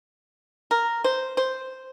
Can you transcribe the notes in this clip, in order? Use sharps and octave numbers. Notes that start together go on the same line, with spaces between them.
A#4
C5
C5